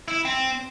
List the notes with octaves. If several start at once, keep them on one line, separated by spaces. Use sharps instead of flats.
E4
C4